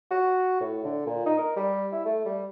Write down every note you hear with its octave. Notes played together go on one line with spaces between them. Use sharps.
F#4
A2
D3
A#2
D#4
A#4
G3
E4
A3
G3